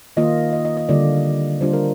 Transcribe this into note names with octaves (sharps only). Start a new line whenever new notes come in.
D#3 A#3 F4 D#5
D#5
D#5
D#5
D3 G3 A#3 D4 F4 D5
D3 G3 D4 F4 C5
A#4